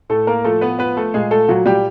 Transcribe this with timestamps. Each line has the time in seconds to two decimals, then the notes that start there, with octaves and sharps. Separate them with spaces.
0.09 A2 A3 A4
0.27 A#3 A#4
0.44 F3 A3 A4
0.61 B3 B4
0.79 F3 B3 B4
0.97 A3 A4
1.14 A#2 G#3 G#4
1.31 A3 A4
1.48 A#2 F#3 F#4
1.66 G3 G4